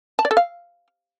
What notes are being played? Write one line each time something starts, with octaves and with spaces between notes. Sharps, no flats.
A5
D5
A4
F5